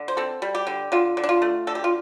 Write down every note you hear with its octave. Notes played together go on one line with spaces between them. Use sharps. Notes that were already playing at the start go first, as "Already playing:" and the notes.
Already playing: D3
C5
C4 A4
G3
G4
D3
D3 F4
D3
D4
F4
A3
D3 A4
G4
F4